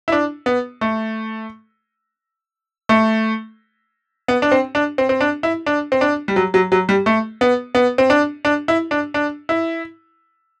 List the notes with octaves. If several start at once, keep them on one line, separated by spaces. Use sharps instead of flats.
E4
D4
B3
A3
A3
B3
D4
C4
D4
C4
C4
D4
E4
D4
C4
D4
G3
F#3
F#3
F#3
G3
A3
B3
B3
C4
D4
D4
E4
D4
D4
E4